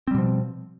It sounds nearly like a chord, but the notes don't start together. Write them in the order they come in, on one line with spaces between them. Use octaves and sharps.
C4 G3 B2 F3